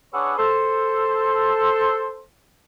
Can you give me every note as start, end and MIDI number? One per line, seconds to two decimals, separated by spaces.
0.14 0.34 62
0.14 0.34 68
0.14 0.34 71
0.14 0.34 73
0.14 0.34 78
0.14 0.34 88
0.38 2.21 69
0.38 2.21 72